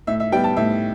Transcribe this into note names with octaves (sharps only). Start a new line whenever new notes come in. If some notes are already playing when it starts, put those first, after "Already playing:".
A2 E5
E5
G3 B3 G5
A5
A2 E5